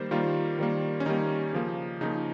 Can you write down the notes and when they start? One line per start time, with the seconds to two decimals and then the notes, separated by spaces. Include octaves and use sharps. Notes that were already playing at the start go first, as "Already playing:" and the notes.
Already playing: D#3 G3 A#3 C5
0.11 D#3 G3 A#3 F4
0.59 D#3 G3 A#3
1.00 C#4
1.06 D#3 G3 A#3 D#4
1.53 C#3 F3 A#3
2.01 C#3 F3 A#3 D#4